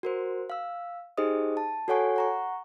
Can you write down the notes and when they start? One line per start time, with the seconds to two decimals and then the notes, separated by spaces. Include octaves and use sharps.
0.03 F#4 A#4 C5
0.50 F5 E6
1.17 D#4 G4 G#4 C5 D#5 D#6
1.57 A5
1.88 F#4 A4 C#5 F#5 G#5 C#6
2.16 F#5 A#5 C#6